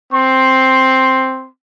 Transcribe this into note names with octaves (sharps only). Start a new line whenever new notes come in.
C4 C6